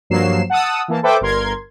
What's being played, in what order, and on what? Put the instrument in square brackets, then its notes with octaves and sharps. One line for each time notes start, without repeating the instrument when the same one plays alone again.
[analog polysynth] G2 F3 F#3 A#3 C7 E7
F#5 A5 D#6 E6
E3 A#3 A5
A4 B4 C5 E5 G5 D6
G1 A#4 C6 G#6